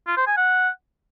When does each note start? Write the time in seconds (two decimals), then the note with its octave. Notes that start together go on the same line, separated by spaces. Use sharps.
0.07 F4
0.17 C5
0.27 G#5
0.37 F#5